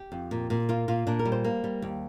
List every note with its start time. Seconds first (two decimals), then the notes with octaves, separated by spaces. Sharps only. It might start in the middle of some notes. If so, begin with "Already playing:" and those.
Already playing: G4
0.12 F2
0.31 A#2
0.50 A#2
0.69 A#3 F4
0.88 A#2 F4
1.07 A#2 D4
1.19 A#4
1.25 G3
1.32 C5
1.44 A#3
1.64 G3
1.82 D#2